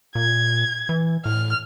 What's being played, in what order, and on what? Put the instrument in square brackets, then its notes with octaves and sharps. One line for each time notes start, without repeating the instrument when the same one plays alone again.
[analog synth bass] A#2 [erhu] G#6
[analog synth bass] E3
[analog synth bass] A2 [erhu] F6